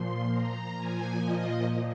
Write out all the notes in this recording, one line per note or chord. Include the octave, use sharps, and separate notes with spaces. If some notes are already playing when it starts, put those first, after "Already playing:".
Already playing: A#2 F3 C6
A#5
A#2 F3 G#5
D#5